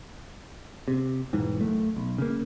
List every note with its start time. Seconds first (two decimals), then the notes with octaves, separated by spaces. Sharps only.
0.88 C3
1.33 E1 G#2 E3
1.61 F#1 F#2 A3
1.96 B1
2.18 C#3 A#3